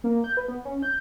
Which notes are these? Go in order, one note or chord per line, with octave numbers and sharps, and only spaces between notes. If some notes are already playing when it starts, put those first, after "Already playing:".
A#3
G6
B4
B3
C#4
G6